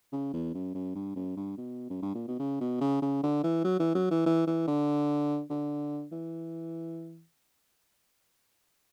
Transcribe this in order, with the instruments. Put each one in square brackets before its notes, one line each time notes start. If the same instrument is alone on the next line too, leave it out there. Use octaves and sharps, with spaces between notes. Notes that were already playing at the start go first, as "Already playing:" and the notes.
[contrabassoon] C#3
E2
F#2
F#2
G2
F#2
G2
B2
F#2
G2
A#2
B2
C#3
B2
C#3
C#3
D3
E3
F#3
E3
F#3
E3
E3
E3
D3
D3
E3